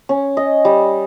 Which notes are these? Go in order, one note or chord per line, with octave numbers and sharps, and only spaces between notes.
C#4
D#5
G3